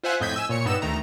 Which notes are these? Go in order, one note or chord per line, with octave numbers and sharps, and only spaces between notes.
F4 C5 E5 F#5 G#5
F2 A2 D#5 G6 G#6 B6
G#5 E6
A#2 C#5 C#7
G2 B3 D#4 E6 E7
D2 D#3 A3 A#5